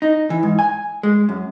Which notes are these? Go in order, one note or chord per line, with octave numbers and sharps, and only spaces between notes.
D#4
E3
G#2
G#5
G#3
F#2